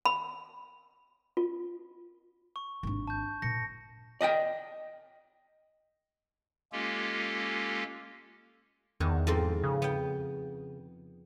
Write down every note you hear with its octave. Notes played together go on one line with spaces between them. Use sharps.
B5
F4
C#6
G#1 D4
A5 G6
A#2 A#6 C#7
D5 D#5 F#5 G5
G#3 A#3 C#4 F4 G4 A4
E2 D#3
F2 G#2 C4
C#3
B3 G5